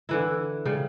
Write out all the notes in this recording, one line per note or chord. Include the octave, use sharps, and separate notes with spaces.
D3 E3 E4
C#3 G3